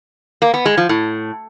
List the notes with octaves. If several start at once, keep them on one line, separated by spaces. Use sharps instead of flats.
A#3
B3
G#3
F3
A2